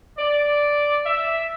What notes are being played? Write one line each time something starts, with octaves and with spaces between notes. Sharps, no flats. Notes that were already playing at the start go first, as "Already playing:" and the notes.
D5
E5